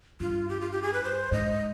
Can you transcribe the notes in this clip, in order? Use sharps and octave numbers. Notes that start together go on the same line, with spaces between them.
G2 F4
G4
F4
G4
G#4
B4
C5
G#2 D#5